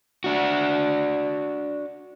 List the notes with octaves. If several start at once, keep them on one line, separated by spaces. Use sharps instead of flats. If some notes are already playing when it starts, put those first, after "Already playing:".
D4 F#4